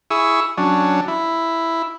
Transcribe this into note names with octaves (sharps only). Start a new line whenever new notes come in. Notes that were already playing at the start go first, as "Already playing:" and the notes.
E4 G#4 C#6 D#6 E6
F#3 C#4 D4
E4